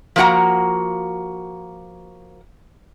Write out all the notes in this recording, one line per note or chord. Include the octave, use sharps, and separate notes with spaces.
F3 A3 A#3 F#4 F#5 A#5